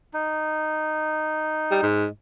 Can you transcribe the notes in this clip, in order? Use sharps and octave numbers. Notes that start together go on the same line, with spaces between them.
D#4
G3
G#2